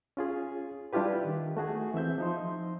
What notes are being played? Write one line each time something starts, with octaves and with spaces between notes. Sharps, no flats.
C#4 F4 G#4
G3 D4 E4 F4 G4 B4
D#3
A3 F#4 G#4
E3 C4 E5 G6
F3 D#4 C6